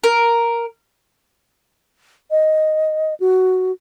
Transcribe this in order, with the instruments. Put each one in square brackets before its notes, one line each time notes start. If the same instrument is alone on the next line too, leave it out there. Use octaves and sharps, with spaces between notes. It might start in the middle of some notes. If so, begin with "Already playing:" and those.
[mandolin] A#4
[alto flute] D#5
F#4